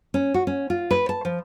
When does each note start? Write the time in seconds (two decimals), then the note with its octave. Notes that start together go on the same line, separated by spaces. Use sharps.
0.14 C#4
0.34 F#4
0.47 C#4
0.70 F4
0.91 B4
1.09 A5
1.25 F3